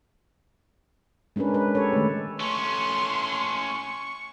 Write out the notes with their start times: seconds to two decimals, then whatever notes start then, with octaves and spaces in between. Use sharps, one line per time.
1.36 G#3 C#4 D4 A#4 B4
1.54 B4
1.75 G4 A4 C#5
1.93 D#3 A3
2.40 A3 C#4 C6 C#6